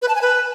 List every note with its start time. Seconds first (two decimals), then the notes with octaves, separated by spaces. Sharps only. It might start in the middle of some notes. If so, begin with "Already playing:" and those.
0.02 B4
0.08 A5
0.15 G#5
0.22 B4